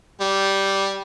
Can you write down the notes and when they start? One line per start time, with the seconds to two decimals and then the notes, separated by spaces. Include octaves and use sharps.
0.21 G3